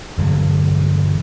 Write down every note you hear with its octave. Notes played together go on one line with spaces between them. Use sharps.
E1 G2 D3 F#3